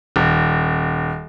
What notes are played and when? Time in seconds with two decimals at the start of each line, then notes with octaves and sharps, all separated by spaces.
0.16 D#1